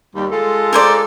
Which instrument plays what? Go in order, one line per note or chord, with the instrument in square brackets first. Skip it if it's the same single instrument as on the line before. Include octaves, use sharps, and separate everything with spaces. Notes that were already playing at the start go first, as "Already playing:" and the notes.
[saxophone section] D#2 G3
G#3 F4 A4
[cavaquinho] A#4 C5 D5